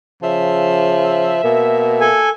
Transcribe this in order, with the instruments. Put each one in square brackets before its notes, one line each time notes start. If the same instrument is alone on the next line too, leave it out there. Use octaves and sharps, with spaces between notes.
[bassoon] C#3 [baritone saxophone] F3 [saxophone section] E5
[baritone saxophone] B2 [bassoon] A#3
[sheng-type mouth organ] A4 G#5